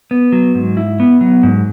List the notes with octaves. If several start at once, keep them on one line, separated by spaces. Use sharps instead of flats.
B3
F#3
G#2
E4
B3
F#3
G#2